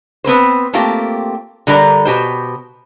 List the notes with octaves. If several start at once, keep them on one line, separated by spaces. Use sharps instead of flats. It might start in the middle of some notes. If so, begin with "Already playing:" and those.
B3 C4 B4 C5
A3 A#3 C4 F4 G4
D3 G3 A#4 D5 A#5
B2 G4 C5